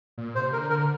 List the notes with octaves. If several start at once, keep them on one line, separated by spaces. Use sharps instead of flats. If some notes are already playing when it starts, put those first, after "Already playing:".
A#2
C3 C5
D3 A#4
D3 A#4